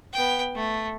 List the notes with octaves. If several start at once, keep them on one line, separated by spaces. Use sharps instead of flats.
B3 G5
A3